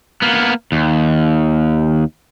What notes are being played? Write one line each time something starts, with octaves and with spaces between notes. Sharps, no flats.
A#3 B3
D#2